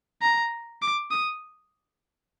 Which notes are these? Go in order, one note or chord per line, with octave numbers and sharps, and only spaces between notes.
A#5
D6
D#6